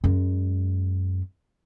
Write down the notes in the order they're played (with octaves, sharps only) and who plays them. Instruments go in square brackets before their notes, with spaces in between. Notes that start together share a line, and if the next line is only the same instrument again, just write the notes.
[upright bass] F#2 G#3